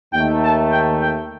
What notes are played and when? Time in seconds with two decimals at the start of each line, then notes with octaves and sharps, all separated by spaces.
0.14 D#2 D#3 A3 G5
0.43 A5
0.70 G5
0.99 G5